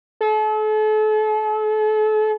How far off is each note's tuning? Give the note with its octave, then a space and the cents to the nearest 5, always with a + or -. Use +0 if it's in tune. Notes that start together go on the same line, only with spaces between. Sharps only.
A4 -40